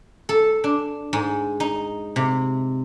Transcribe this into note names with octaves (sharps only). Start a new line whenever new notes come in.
A4
D4
G#2
D#4
C3